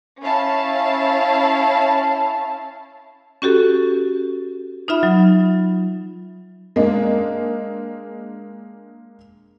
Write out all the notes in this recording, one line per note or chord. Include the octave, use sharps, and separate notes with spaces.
C#4 E4 F5 A5
C#4 F#4 G4 A4
D#4 F4 E5 B5
F#3
G#3 A#3 D4